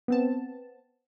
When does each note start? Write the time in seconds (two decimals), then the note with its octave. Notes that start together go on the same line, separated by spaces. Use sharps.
0.08 B3 C4 A5